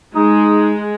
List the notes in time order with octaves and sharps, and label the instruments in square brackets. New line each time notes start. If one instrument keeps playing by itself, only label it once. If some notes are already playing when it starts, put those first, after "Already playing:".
[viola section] G#3 [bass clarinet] D#4